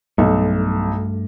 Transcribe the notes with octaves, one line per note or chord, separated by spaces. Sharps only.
B1 G2 A3